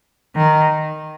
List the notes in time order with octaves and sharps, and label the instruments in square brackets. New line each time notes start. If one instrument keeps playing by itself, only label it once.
[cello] D#3